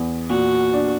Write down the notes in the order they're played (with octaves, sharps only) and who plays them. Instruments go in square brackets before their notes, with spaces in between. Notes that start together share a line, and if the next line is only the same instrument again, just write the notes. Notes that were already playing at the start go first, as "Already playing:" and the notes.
Already playing: [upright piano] E2
[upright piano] A#2 [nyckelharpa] F#4
[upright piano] D4